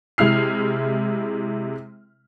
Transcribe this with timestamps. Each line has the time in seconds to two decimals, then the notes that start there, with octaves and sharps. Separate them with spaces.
0.18 C3 G#3 E4 F6 C7